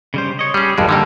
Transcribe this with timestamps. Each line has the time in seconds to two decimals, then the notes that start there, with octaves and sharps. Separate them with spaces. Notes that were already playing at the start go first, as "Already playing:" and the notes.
0.14 C#3 G3 C5
0.39 C#5 D#5
0.54 G3 C#4 G#4
0.78 G#1 F2 G3 G#3
0.89 D3 G3 A#3 D#4 G4